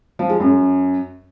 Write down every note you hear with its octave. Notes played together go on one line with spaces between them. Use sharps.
F3
G#3
F#2